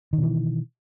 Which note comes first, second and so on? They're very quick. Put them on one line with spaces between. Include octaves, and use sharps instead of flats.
D#3 B2 E3